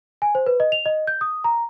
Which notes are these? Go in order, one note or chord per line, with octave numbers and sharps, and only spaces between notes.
G#5
C5
B4
D#5
F7
D#5
G6
D#6
A#5